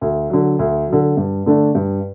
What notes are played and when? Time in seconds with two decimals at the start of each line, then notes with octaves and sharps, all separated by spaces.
0.01 D2
0.30 D3 F#3
0.59 D2
0.88 D3 F#3
1.17 G2
1.46 D3 A3 D4
1.75 G2